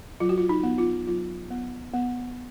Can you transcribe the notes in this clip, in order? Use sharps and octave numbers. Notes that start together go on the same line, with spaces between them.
F#3 F4
F#4
F4
D#4
B3
F4
F#3 F4
B3
B3